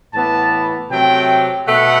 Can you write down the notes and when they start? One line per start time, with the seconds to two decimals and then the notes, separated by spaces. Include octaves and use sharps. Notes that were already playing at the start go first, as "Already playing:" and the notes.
0.13 A2 E3 B3 A5
0.90 C3 F#3 A3 C4 G5
1.68 B2 A3 F#5